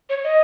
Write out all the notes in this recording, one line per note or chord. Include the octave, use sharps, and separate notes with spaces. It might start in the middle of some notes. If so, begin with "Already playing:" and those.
C#5
D#5